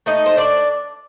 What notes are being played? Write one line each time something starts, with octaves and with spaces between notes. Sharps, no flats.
A3 D#4 D#5
C5
D4 D5